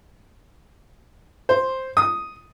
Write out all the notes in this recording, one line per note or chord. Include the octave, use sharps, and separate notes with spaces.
C5
D#6